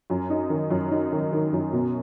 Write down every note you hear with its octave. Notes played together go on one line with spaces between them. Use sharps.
F#2
D#4
D#3
F#2
D#4
D#3
D#3
F#2
B2